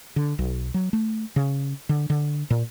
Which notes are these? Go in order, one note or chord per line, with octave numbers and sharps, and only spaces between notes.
D3
B1
F#3
A3
C#3
D3
D3
A#2